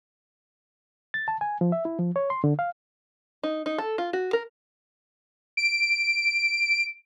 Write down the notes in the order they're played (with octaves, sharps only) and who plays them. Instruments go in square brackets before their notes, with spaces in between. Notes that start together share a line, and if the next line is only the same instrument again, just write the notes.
[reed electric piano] A6
A5
G#5
F3
E5
E4
F3
C#5
C6
D3
F5
[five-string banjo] D#4
D#4
A4
F4
F#4
A#4
[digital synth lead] D7